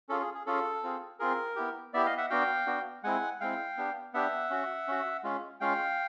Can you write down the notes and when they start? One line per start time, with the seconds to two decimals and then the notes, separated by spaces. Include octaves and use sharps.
0.09 C#4 F4 G#4 A4
0.22 G#4
0.35 G#4
0.46 C#4 F4 G#4 A4
0.83 C4 F4 G#4
1.19 C4 F4 G#4 A#4
1.56 B3 E4 G4
1.93 B3 E4 G4 D5 E5
2.06 D#5 F5
2.17 E5 F#5
2.30 B3 D4 F#4 F5 G5
2.66 B3 D4 F#4
3.04 G#3 C4 E4 F#5 G#5
3.41 G#3 C4 E4 F5 G5
3.77 B3 D4 G4
4.14 B3 D4 G4 E5 F#5
4.50 C#4 F#4
4.88 C#4 F#4
5.24 G#3 C#4 F4
5.60 G#3 C#4 F4 F5 G5